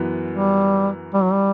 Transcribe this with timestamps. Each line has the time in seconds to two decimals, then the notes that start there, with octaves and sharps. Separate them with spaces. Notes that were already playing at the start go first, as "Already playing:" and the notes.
Already playing: F#2 E3 B3
0.31 G3
1.14 G3
1.23 F#3
1.32 G3